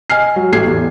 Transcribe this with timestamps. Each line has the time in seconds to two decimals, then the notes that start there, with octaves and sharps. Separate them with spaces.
0.10 D#5 G#5 F6 C7
0.36 F#3
0.52 A1 A3 G4 G#6 C7
0.67 E2